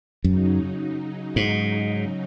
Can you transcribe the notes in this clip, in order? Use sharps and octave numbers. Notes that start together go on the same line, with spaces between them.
F#2 C#3 F#3 D#4
G#2